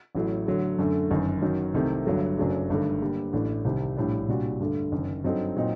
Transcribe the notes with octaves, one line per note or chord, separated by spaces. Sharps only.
A1 A2 F#3 A3
D3 F#3 A3
F#2 D3 A3
G1 F#2 D#3
F#2 D#3 F#3
C2 C3 D#3 A3
G1 G2 F#3 A3
F#1 F#2 F#3 A3 D4
G1 G2 D#3 A3
D3 G3 A#3
A1 A2 A3 D4
C2 C3 D#3 G3
A#1 A2 G3 D4
C2 A#2 G3 D4 F#4
G2 D3 A3
F#1 F#2 D#3
G2 F#3 C4 D#4 A4
A#2 F#3 C4 D#4